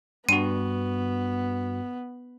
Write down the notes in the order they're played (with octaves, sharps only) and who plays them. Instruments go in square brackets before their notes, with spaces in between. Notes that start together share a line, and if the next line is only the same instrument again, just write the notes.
[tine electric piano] G2 F#4 [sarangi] B3 [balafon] D4 [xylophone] D#7